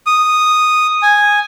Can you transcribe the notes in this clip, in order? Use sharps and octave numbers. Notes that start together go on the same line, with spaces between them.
D#6
G#5